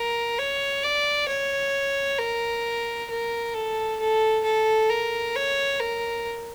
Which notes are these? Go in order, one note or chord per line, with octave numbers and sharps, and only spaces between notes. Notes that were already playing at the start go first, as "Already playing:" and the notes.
Already playing: A#4
C#5
D5
C#5
A#4
A#4
A4
A4
A4
A#4
C#5
A#4